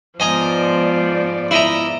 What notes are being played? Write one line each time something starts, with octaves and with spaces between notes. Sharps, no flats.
G#2 F3 B3 D5 D#5 G#5 A#5
E4 D#5 A#5